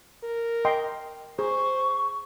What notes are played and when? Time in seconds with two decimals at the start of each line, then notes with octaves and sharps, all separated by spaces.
0.23 A#4
0.65 D#5 G5 C6
1.39 G#4 C5 C#6